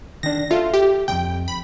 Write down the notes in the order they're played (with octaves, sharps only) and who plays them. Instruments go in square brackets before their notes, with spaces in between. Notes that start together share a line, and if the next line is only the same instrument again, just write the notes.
[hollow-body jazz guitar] D#3 D4 [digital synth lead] A#6
[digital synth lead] F4 [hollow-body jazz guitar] A4 E5
[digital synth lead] G4
[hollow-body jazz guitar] C2 F2 [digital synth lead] G5
[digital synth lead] B5